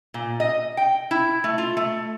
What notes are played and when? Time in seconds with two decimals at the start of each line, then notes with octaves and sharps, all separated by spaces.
0.14 A#2
0.40 D#5
0.77 G5
1.11 E4
1.44 A3
1.58 F4
1.77 A3